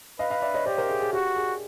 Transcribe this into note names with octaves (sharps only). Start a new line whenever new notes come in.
B4 D#5 F5
D#5 F5
D5 E5
C#5 D#5
G4 C5 D5
A#4 C5
G#4
G#4
F#4 G4
G#4